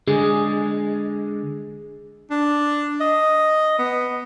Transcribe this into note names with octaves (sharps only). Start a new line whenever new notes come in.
D3 G#3 G#4
D4
D#5
B3